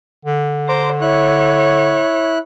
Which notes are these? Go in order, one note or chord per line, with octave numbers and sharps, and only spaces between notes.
D3
C5 A#5 D6
E4 C#5 F#6